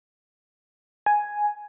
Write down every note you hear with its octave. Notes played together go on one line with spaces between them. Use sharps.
G#5